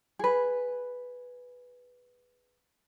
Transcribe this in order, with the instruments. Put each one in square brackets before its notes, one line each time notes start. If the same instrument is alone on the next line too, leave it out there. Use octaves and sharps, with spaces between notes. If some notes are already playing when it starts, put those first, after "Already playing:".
[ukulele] G#4 B4